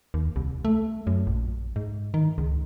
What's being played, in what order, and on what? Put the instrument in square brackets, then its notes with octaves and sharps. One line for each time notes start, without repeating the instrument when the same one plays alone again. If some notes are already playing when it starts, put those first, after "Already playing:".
[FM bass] D#2
C2
A3
F#2
A#1
G#2
D#3
C#2